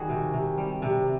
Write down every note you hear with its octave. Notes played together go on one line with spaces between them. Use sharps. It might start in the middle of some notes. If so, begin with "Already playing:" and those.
Already playing: D#3 G3 F#4 G#4
C3
C3
G3
C3